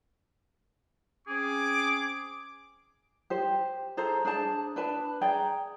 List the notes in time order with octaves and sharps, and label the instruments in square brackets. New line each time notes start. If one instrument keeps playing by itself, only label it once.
[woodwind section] C4 C#4 G#4 [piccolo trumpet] D6
[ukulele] G4 C5
G#4 A4 C5 A#5
D4 G#4 C5 A5
D4 B4 A5
G#4 D5 G5 A#5